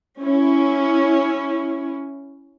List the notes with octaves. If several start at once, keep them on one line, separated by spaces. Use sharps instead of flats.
C#4 E4